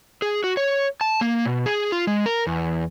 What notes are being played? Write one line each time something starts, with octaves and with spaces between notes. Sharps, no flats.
G#4
F#4
C#5
A5
A#3
B2
G#4
F4
G#3
A#4
E2